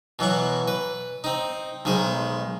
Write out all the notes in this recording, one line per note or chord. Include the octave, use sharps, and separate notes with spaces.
B2 E3 F#3 C#6
B4
C4 D#4
B1 D#3 G#3 C5